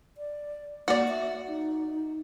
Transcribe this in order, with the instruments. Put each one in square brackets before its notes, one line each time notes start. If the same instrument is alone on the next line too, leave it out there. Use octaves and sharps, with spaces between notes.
[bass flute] D5
[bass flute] A#3 [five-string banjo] F#4 D5
[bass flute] E5
D#4